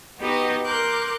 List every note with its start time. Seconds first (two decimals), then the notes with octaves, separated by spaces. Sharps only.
0.18 B3 D#4 F#4 G4 B4 D#5
0.64 A#4 C6 D6 F#6 G6